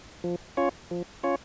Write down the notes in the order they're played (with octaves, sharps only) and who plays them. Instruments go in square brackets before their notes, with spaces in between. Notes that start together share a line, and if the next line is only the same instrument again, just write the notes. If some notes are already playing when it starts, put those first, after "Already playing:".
[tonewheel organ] F3
C#4 F4 C#5
F3
C#4 F4 C#5